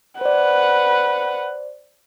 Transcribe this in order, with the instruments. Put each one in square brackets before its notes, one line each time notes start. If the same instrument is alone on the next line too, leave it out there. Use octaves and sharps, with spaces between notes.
[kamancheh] B4 F#5 [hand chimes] C5 D5